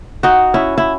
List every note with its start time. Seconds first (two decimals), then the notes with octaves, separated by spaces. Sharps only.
0.23 D#4 F#4
0.54 C#4 E4
0.78 E4